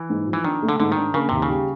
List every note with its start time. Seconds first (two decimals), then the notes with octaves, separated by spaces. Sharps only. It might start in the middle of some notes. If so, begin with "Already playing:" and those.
Already playing: E3
0.10 G#2
0.27 F3
0.33 E3
0.44 D#3 D4
0.62 A3
0.69 D3
0.80 G#2 D3
0.92 D#3 D4
1.14 C#3 A#3
1.29 D#2 C3
1.42 C#3
1.49 G3